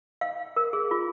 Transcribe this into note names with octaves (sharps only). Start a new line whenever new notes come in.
F5
A#4
G#4
F4